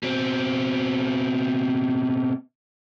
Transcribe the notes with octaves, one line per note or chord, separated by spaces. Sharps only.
B2 C4